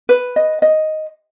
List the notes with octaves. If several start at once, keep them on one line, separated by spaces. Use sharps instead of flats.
B4
D#5
D#5